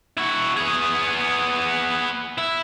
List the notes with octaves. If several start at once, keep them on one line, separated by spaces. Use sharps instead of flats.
E4 F#4
B3 G#4
E4